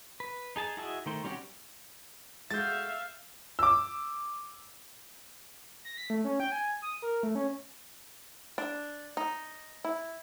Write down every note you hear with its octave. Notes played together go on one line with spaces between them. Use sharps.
B4
D#4 G#4 A5
E4 F#4 G#4 D#5 E5
D#3 A3 C5
G3 C4 C#4 F#4 G4
G#3 F#4 A4 E5 F5 G6 A6
D6 E6
A#6
B6
A3
C#4
G5
G#5
D#6
A#4
A3
C#4
D4
D#4
E4